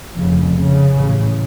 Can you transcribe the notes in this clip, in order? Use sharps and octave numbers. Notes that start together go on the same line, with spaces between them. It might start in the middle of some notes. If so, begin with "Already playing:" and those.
F1 F2 C#3
C#3
A1 A2